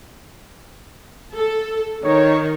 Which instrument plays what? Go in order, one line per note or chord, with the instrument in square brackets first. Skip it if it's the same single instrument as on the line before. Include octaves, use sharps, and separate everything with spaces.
[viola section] A4
[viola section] D#3 [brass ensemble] C#5